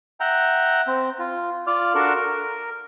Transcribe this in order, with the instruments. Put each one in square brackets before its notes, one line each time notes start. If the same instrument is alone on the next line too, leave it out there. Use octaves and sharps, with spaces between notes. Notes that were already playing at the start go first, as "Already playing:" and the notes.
[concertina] E5 F#5 G5 A#5
C4
F4
F4 D5 D6 F6
D4 F#4 A4 A#4
A#4